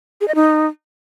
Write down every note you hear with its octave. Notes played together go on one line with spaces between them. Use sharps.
G#4
D#5
D#4